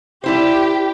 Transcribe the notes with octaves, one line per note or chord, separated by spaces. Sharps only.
G3 E4 G4 C5